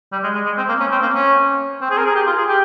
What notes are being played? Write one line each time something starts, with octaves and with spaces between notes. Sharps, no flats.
G3
G#3
G#3
G#3
C4
A#3
C#4
C4
A#3
C#4
C4
G#4
A#4
G#4
G4
F4
G#4
G4